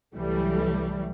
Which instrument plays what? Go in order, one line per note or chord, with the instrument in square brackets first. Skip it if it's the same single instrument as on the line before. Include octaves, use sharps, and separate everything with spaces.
[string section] C2 E3 F#3 G3 A3